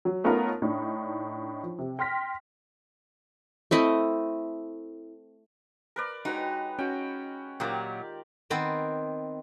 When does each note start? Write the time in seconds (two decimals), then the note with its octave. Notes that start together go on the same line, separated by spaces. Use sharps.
0.05 F#3
0.24 A3 B3 C#4 D#4 F4 A#4
0.62 A2 D4 D#4
1.63 F3
1.79 C3
1.99 G5 C6 F6 A#6 B6
3.71 A3 C4 E4 D#5
5.96 A#4 B4 D5
6.25 G#3 D#4 F#4 G4 B4 C#5
6.79 C#4 F#4 G5
7.60 A#2 D#3 F#3 F4 G4 A#4 D5
8.50 D#3 B3 C4